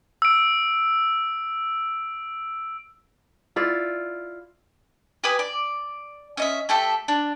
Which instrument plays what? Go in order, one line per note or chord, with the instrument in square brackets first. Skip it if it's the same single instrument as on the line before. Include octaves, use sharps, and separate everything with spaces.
[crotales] E6 D7
[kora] E4 F4 D5
[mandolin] G4 B4 G#5 D#6
D5
C#4 D#5 E5
A3 G4 A4 E5
D4